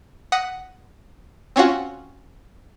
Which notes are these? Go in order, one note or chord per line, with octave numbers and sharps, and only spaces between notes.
F#5 D#6 A#6 B6
C4 C#4 F4 F#4